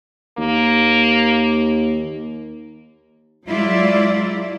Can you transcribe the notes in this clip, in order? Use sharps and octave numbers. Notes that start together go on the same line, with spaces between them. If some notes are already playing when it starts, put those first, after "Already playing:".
D#2 A#3
F#3 G#3 E4 F4 D5